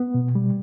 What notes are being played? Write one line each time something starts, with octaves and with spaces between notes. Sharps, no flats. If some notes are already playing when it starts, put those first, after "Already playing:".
Already playing: B3
B2
G3